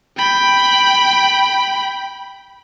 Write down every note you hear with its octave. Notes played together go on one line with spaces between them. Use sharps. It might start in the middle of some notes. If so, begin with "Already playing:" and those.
G5 B5